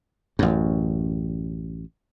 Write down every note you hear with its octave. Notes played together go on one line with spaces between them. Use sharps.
A1 F#2